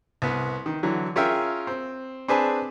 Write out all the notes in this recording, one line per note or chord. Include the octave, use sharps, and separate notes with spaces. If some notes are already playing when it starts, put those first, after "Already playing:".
C2 B3
D#3
D3 E3 F#3
C#4 F4 G#4 A#4 E5 G5
C4
C4 D4 G#4 B4 G#5 A5